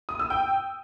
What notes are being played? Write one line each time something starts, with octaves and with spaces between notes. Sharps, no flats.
D#6
E6
G5